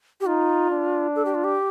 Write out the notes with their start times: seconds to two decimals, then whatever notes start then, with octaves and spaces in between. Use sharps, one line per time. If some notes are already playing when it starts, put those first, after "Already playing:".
0.21 G4
0.26 D#4 F4
0.70 D4
1.16 A4
1.25 G4
1.35 F4
1.44 G4